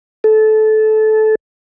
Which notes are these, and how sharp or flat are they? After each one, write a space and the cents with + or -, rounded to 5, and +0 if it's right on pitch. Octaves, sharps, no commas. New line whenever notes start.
A4 -20